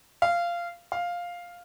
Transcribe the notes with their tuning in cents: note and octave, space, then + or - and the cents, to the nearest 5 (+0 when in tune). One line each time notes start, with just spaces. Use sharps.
F5 -15
F5 +5